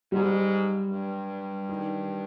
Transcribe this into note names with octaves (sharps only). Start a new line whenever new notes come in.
G#2 G3
G2
D#3